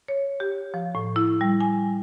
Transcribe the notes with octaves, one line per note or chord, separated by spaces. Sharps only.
C#5
G4
F3
A2
E4
G3
G#5